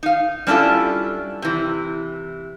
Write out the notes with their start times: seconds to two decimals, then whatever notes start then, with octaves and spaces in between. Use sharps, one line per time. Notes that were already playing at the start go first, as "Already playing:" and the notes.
0.03 D#4 F5
0.47 G3 C#4 D4 E4 F4 A4
1.42 C3 E3